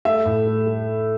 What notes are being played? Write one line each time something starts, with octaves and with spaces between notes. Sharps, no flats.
A3 E5
A2
A3
A3